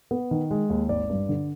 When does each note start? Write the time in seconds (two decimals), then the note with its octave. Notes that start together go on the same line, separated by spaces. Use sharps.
0.11 B3
0.31 D#3
0.51 G#3
0.70 D#2
0.89 G#1 D5
1.10 G2
1.29 D3